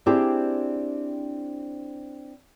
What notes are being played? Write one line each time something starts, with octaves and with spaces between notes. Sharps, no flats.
C4 D4 E4 G4 G#4 C5